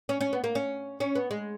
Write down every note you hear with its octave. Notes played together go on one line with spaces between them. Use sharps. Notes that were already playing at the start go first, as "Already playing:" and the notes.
C#4
C#4
B3
A#3
C#4
C#4
B3
G#3